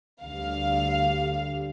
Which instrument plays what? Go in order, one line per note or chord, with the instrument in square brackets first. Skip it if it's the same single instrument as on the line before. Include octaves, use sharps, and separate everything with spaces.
[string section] D2 D3 G3 F5